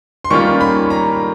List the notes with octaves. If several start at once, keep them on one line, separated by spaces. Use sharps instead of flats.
C6
D#3 G3 A#3 C#4 F4 C#6
B5
A#5